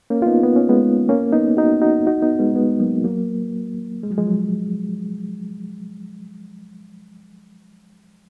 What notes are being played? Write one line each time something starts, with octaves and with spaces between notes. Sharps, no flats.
A#3 C#4
F4
B3 D#4
B3
C#4
G#3 B3
A#3 C#4
B3 D#4
D#4 F#4
D#4 F#4
D#4 F#4
B3 D#4
G#3 B3
G#3 B3
F#3 A#3
F#3 A#3
G#3
F#3
F3 G#3
F#3